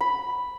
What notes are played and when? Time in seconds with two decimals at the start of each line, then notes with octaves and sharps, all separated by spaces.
0.01 B5